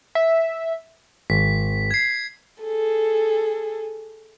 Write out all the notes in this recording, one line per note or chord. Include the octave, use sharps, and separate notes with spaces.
E5
G#1 B6
G#6 C7
G#4 A4